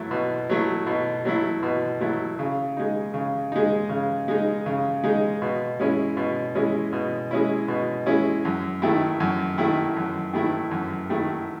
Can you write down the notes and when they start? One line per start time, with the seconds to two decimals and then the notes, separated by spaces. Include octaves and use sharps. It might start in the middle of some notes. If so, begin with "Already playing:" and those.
Already playing: F#3 A3 E4
0.11 B2
0.50 F#3 A3 E4
0.87 B2
1.25 F#3 A3 E4
1.63 B2
2.01 F#3 A3 E4
2.39 C#3
2.77 G#3 D#4
3.14 C#3
3.52 G#3 D#4
3.89 C#3
4.28 G#3 D#4
4.66 C#3
5.04 G#3 D#4
5.42 B2
5.80 G#3 C#4 E4
6.17 B2
6.55 G#3 C#4 E4
6.93 B2
7.31 G#3 C#4 E4
7.68 B2
8.06 G#3 C#4 E4
8.45 F#2
8.82 D#3 A3 E4
9.20 F#2
9.58 D#3 A3 E4
9.96 F#2
10.33 D#3 A3 E4
10.71 F#2
11.10 D#3 A3 E4